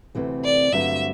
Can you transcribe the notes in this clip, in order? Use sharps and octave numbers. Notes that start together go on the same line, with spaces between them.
D2 C3 E3 A3 C4
D5
G2 D3 F#3 A3 C4 E5